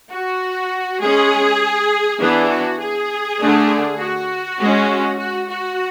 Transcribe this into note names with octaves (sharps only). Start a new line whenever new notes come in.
F#4
G#3 C#4 G#4
E3 B3 D4 G#4
F#4
G#4
D3 A3 D4
F#4
G#3 C#4
F#4
F#4